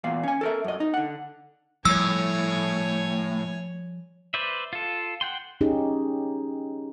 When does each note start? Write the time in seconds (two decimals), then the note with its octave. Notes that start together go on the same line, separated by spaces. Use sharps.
0.04 E2 A#2 F5
0.23 C#4 G#5
0.41 A4 A#4 E5
0.64 F#2 D#5
0.80 D#4
0.94 D3 F#5
1.85 A2 F3 G3 C#5 G#5 E6
4.34 B4 C5 D5 E5
4.73 F4 A4
5.21 F#5 G5 C6
5.61 C#4 D#4 G4 G#4